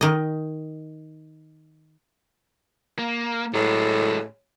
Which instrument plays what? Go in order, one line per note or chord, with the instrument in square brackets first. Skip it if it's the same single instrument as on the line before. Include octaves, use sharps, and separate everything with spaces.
[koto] D#3 D#5
[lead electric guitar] A#3
[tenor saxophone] A2 [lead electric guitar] F#3 G#3